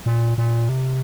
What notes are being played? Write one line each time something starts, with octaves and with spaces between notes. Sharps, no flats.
A#2
A#2
C3